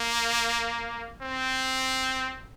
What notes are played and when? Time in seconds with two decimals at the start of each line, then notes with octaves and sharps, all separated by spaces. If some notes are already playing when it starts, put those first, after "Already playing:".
Already playing: A#3
1.22 C4